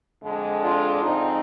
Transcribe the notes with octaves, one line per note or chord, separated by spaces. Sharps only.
F2 D3 G#3
D4 F4
G#2 F3 G#3 C4 D#4